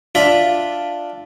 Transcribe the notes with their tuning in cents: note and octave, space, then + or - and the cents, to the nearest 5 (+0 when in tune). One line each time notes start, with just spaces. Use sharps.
D4 +0 F4 +0 E5 +0